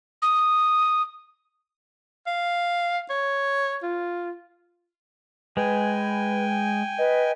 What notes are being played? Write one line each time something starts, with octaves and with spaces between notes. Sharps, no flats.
D#6
F5
C#5
F4
G#3 B4 G5 G#5
B4 D#5